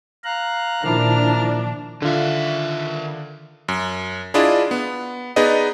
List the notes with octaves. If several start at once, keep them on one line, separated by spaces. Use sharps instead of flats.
F5 A#5 F#6
A#2 D#3 F3 D4 E4 A#5 F6
D3 D#3 F4 E5
F#2
D4 E4 F4 G#4 D5 D#5
B3
B3 D#4 G#4 B4 D5 D#5